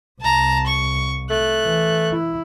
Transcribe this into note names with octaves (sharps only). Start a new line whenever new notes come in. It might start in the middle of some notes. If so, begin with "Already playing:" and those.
C2 A5 A#5
C#6
A3 F#6
E3
E4